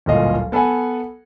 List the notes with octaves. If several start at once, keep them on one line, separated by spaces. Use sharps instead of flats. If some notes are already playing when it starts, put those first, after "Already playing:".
D1 G1 A#2 D#5 F5
B3 A4 B4 F#5 G#5